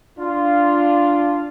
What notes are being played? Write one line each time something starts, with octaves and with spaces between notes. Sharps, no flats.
D4 F4